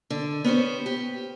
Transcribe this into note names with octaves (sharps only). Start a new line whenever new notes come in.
D3
B3 C#4 G4 C5
G4